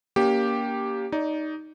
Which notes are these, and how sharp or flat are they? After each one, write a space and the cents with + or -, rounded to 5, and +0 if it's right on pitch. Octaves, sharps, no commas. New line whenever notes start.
A#3 +10 C#4 +40 G4 +0
D#4 +0 D5 -25